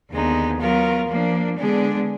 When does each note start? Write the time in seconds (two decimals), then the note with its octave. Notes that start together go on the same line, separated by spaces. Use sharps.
0.11 D#2 D3 G#3 B3 D#4
0.60 F#3 B3 F4 A#4
1.09 F3 A#3 D4
1.58 D3 G#3 B3 D4 G#4